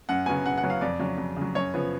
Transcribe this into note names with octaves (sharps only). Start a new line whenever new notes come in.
F#2 F#5
C#3 F#3 B3 G#5
F#2 F#5
F#5
C#3 F#3 B3
F5
F2 D5
C#3 F#3
F2
C#3
F#3
F#2 C#5
C#3 F3 B3